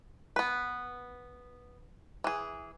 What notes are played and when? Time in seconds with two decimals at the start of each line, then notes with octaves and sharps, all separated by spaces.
0.36 B3 B4
2.24 E3 G#4